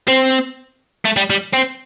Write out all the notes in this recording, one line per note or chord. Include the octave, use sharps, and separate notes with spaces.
C4
A3
G3
G3
C4